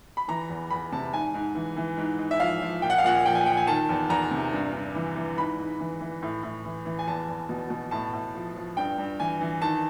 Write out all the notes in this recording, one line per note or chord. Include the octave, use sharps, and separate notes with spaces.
B5
E3 A#5
E2
E2 B5
C3 A5
G#2 G#5
G#2
E3
E3
G#2
G#2
E5
F3 F5
F3
A#2 G5
F#5
F5
A#2 F#5
F3 G5
G#5
F3 G5
G#5
D#3 A5
E2
E2 A#5
C3
G2
G2
E3
E3
G#2 B5
G#2
E3
E3
A2
A2
E3
E3
G#5
E2 A5
E2
B2
B2
A2 A5
A2
F3
F3
G2 G5
G2
E3 G#5
E3
D#3 A5